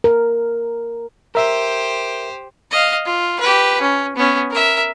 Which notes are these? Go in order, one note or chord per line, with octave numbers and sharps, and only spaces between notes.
A#4
G4 A#4 C5 E5
D#5 F5
F4
G4 B4
C#4
B3 C#4
A#4 E5